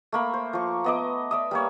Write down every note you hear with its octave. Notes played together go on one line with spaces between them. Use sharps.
A3 A#3 B5
C5
F3 C#6
B3 D#5 D6
D5 E5 D#6
G3 A#3 C#5